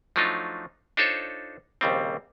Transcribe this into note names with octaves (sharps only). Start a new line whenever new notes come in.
F3 F#3 A3 D4 D#4 F4
D4 D#4 F4 A4 C5 C#5
A#1 D#2 C#3 G3 C4